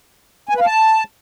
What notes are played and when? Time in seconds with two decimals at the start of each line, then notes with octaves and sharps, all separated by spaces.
0.49 G#5
0.55 B4
0.60 F5
0.66 A5